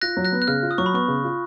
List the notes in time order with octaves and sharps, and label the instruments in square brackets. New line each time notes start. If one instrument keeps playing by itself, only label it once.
[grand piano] F4 [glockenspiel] F#6 A#6
[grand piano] F#3
[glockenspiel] F#6 A#6
[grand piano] B3
[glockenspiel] F#6
[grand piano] C#3 [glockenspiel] F6
[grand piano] F4
[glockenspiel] D#6
[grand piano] F#3 [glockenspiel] C#6
[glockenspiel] B5
[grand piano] B3 [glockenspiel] C#6
[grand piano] C#3
F4